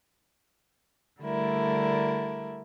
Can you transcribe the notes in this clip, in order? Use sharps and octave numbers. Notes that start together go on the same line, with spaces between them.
D3 G3 A3 E4 A#4